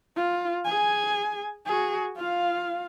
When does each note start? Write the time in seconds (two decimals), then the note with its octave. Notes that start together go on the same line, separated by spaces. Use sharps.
0.16 F4
0.65 G#4 G#5
1.66 F#4 G#4
2.16 F4 F5